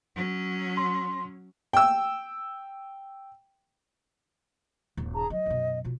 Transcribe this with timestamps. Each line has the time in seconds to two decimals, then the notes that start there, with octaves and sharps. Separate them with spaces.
0.15 F#3 C#4
0.77 C6
1.73 G5 E6
4.97 D#1 G2
5.14 G#4 A5 A#5
5.30 F#3 D#5
5.46 F#2 B2
5.84 B2 F4